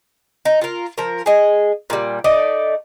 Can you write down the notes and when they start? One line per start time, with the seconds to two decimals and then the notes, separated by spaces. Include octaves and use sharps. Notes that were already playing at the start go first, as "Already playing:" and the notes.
0.45 D#4
0.62 F4 A#4
0.98 F3 A#4
1.26 G#4 D#5
1.90 A#2 G3
2.24 A3 D#4 D5